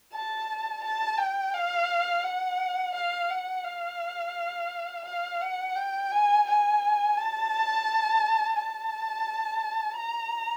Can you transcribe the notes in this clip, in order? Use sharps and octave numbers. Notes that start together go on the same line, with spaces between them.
A5
A5
G5
F5
F#5
F5
F#5
F5
F5
F#5
G5
G#5
G#5
A5
A5
A#5